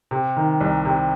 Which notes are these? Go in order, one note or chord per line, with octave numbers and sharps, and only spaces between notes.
C3
D#3
C2
C3